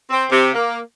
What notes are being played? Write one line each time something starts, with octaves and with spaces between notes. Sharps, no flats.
C4
C3
A#3